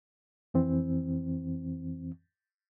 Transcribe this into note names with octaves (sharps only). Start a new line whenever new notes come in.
F2 E3 C4